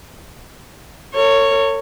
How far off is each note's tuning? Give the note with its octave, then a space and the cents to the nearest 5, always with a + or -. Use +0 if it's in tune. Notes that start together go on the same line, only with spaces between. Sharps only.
A#4 -45 C#5 +0